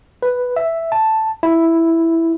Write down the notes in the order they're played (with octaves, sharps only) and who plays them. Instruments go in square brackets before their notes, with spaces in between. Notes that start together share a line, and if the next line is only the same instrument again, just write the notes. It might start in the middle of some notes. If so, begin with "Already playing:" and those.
[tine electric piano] B4
E5
A5
E4